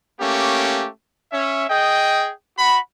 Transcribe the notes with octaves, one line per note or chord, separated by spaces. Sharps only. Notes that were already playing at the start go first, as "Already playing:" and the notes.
A3 A#3 C#4 G4
C#4 E5
G#4 D#5 G5
F#4 B5